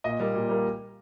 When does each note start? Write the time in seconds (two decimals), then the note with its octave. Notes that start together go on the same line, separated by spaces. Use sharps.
0.04 A#2 D#5
0.20 G3 A#3
0.35 A#2
0.49 G3 A#3